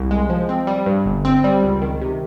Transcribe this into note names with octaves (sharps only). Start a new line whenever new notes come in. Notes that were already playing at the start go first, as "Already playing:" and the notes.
Already playing: C2
G#3
F3
C4
G3
G2
G1
C4
G3
C#2
D#3
C3